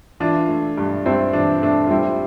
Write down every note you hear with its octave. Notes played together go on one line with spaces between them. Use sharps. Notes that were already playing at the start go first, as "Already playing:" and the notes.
E3 D4 F4
A3
G2
G2 C4 E4
E3 D4
A3 D4
F4
G3 C4 E4